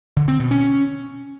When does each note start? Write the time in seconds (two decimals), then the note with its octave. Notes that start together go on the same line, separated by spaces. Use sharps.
0.17 D3
0.28 C4
0.39 B2
0.51 C#4